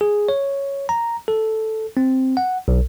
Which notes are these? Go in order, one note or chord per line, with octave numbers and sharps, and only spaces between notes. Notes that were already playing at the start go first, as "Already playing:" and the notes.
G#4
C#5
A#5
A4
C4
F#5
B1